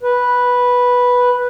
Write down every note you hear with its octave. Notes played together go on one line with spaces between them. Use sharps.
B4